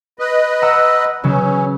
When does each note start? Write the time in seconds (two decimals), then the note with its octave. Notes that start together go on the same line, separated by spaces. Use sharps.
0.19 B4 D#5
0.62 F#5 A#5 E6
1.24 C#3 F#3 B3 C#4